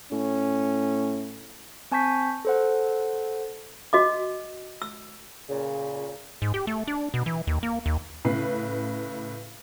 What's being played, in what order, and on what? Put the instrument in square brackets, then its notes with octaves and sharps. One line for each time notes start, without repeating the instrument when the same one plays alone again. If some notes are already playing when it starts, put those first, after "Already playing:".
[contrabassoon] A2 [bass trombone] C#4
[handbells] C4 G#5 A5 C#6 G6 B6
A4 C5 F#5
[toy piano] F#4 D#5 D6
E6
[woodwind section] A#2 C#3
[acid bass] G#2
G4
A3
D4
B2
E3
D#2
A#3
D#2
[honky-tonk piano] A2 C#3 B4 C7